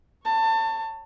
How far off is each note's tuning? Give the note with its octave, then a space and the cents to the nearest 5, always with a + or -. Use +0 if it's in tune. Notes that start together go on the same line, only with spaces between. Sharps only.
C#5 +0 A5 +25